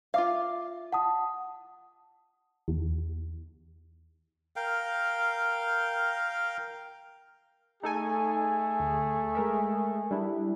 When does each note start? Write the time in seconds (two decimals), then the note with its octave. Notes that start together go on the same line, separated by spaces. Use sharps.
0.14 F4 E5 F5 D6
0.92 F#5 A5 D#6
2.68 E2
4.56 A#4 F5 G5
7.83 A3 D#4 G#4 A4 G#5
8.80 D2
9.35 G#3 A#4 E5
10.11 G3 D4 E4